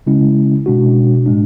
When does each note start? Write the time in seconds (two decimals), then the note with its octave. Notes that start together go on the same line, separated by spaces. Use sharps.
0.07 C#3 G#3 C#4 E4
0.66 B2 G#3 D4 F#4
1.26 A2 G#3 D4